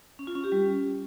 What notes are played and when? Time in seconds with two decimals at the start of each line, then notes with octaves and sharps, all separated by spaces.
0.19 C#4
0.27 F4
0.35 C#4
0.44 G4
0.52 G3